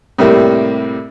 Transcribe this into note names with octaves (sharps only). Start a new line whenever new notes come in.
A2 C3 G3 A#3